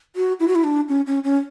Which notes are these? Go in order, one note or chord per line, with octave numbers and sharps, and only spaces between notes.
F#4
E4
F#4
E4
D4
C#4
C#4
C#4